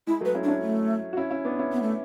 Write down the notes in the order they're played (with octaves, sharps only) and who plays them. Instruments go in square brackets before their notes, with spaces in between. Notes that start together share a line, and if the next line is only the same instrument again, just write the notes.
[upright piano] G#3 [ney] E4
[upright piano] F#3 A3 [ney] B4
[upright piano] C#4 E4
[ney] D4
[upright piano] C#4 E4
[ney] A3
[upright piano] F#4
C#4 E4
C#4 E4
B3 D4
C#4 E4
[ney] B3
A3